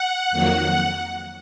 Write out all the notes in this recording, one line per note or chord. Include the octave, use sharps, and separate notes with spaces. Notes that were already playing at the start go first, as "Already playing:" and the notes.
Already playing: F#5
F2 D#3 F#3 A#3